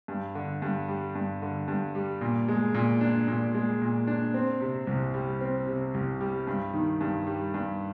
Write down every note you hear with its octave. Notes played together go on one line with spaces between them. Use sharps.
G2
D3
G2
G3
G2
D3
G2
G3
A#2
G#3
A#2
D4
A#2
G#3
A#2
D4
C4
C3
C2
G3
C4
C3
C2
G3
G2
D#3
G2
G3
G2